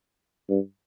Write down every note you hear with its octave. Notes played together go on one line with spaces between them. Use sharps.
G2